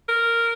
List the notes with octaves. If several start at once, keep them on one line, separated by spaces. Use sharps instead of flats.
A#4